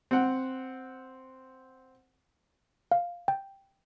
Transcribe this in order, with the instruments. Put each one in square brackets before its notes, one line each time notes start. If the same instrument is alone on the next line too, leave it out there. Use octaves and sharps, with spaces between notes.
[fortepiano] C4 F#5
[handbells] F5
G5